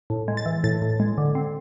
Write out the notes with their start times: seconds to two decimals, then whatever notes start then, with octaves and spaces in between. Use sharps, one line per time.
0.10 A2
0.28 G#3
0.37 A6
0.46 E3
0.64 A2 A6
0.82 A2
1.00 G#3
1.18 D3
1.35 C4